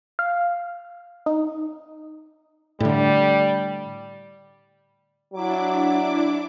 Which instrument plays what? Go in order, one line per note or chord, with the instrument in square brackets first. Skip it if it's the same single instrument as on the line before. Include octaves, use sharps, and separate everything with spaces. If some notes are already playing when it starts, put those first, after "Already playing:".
[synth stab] F5
D#4
[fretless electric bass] A2 D3 [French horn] G3
[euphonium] F#3 [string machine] D4 E4 D6